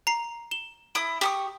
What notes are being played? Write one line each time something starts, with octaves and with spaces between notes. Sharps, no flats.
A#5 C7
E7 G7
E4 D#6 D7
G4 C#6 D#6